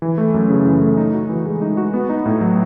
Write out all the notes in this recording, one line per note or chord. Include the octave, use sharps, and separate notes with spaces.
E3
A3
F#2
C#3
E3
A3
D#4
F#4
E3
G#3
D#4
F#4
B3
D#4
A2
F#3